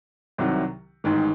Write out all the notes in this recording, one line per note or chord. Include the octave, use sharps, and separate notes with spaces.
C2 C3 D#3 F#3
A1 G#2 D#3